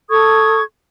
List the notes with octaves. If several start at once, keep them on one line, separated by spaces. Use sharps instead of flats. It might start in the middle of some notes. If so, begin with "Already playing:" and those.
A4 C#6 D#6 G#6